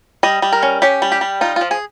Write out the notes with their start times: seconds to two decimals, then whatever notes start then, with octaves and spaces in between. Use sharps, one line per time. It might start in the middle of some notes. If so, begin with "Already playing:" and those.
0.23 G3 D#5
0.42 G3
0.53 A#4
0.63 C#4
0.82 C#4 G4
1.02 G3
1.12 G4
1.21 G3
1.41 D#4 F4
1.56 F3 F4
1.71 G#4